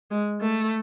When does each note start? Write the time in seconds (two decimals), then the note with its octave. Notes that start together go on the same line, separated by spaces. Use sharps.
0.11 G#3
0.40 A3